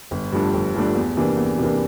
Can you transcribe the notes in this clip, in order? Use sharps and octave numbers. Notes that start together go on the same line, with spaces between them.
G1
G2 F3 A3 D4
G1
G2 F3 A3 D4
E2
C3 E3 A#3 D4
E2
C3 E3 A#3 D4